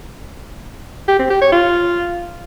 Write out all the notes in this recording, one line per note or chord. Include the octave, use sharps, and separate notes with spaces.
G4
C4
G4
C#5
F4